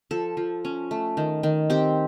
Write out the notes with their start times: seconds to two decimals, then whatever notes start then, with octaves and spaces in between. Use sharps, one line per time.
0.11 F3 A4
0.37 F3
0.65 C#4
0.91 A3
1.17 D#3
1.43 D#3
1.70 C4 G4